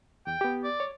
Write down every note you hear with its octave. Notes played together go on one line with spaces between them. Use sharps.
E2 G5
B3 G4
D5
C#5